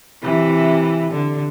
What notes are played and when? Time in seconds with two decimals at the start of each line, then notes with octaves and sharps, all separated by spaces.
0.22 C3 E3
1.11 D3